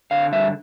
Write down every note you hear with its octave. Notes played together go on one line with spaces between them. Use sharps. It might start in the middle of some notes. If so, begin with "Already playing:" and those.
D3 F5
G2 E5